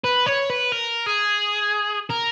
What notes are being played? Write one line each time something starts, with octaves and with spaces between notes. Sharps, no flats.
B4
C#5
B4
A#4
G#4
A#4